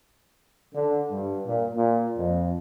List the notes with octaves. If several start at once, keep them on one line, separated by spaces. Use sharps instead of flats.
D3
G2
A#2
A#2
F2